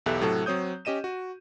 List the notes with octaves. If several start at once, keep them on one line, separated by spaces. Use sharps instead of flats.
B1 E2 G4 A4 E5 F#6
A2 C3 F#3 A4
F#3 C4 C#5 D#6 G6
C#4 G4 D#5 D#7 E7
F#4